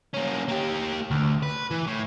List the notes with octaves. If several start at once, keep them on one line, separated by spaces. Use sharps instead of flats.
A#3 C#4
A#3 G4
D2
B4
E3
A2